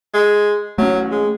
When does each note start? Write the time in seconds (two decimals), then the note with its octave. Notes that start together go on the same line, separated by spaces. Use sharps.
0.14 G#3
0.78 F#3 A3 C#4
1.11 G#3